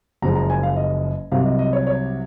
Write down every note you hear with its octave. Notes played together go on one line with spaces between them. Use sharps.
F#1 F#2 F3 G#3 A#5
A#5
G#5
F5
D#5
C2 C3 F#3 F5
D#5
D#5
C#5
C#5